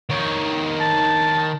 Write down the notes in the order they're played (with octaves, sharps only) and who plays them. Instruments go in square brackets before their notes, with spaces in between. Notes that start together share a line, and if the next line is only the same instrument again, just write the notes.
[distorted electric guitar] D#3 C#5
[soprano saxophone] A5